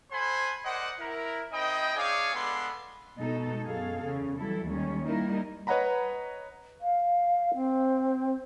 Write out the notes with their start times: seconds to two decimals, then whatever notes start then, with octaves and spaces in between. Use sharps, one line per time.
0.11 A4 C5 F#5 G#5 B5 C6
0.64 A#4 C5 D5 D#5 F#5
0.99 E4 A#4
1.52 C4 D#4 E4 D#5 G5 B5
1.95 D4 G#4 C#5 D5 F5 G#5
2.33 G#3 B3 D4 A4 B5 C6
3.19 B2 G#3 D#4 A4
3.64 F#2 B2 G#4 A4 F5
4.03 E2 C#3
4.38 E3 F#3 G3 E4 A4
4.67 D#2 D#3 G3 G#3 C#4
5.04 G3 A#3 D#4 E4 A#4
5.67 B4 C#5 D#5 F#5 A#5 B5
6.81 F5
7.54 C4